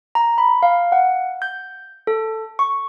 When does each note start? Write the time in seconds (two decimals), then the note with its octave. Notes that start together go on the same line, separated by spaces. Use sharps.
0.15 A#5
0.38 B5
0.63 F5
0.92 F#5
1.42 G6
2.07 A4
2.59 C#6